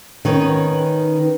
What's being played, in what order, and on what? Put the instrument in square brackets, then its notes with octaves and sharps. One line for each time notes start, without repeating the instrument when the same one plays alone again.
[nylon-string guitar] D#3 C#4 [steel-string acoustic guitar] B3 B4 C#5